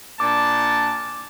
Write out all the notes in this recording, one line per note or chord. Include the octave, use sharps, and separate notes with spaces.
A#2 D4 A5 D6